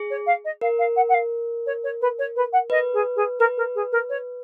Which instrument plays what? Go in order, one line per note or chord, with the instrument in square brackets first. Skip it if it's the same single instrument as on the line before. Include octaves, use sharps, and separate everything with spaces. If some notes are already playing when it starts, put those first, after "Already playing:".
Already playing: [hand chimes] G#4
[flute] C#5
F5
D#5
[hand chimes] A#4 [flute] F5
[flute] F5
F#5
F#5
F5
C#5
C#5
B4
C#5
B4
F#5
[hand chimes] B4 [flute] D#5
[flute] G#4
G#4
[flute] A#4 [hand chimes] B4
[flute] A#4
G#4
A#4
C#5